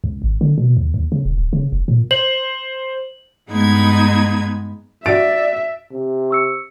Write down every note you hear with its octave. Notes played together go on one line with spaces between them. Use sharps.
C#2
G#1
D3
B2
D#2
D#2
C#3
D#1
D1
C#3
F1
A#2
C5 F#7
G2 G#3 B3 D#4 B5 G#6
F#4 D5 E5 A6 D7
C3
C#6 E6 C#7